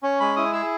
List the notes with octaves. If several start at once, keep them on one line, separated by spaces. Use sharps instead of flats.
C#4 C#5
G#3 B5
E4 D#6
G#4 E6